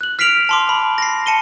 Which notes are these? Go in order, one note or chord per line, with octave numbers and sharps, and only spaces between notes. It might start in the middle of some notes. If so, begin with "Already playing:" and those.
F#6 F#7
F6 B6 C7 D7 F7 F#7
A5 C6 D6
B5
A#6 C7
A5 C#7 D#7 G7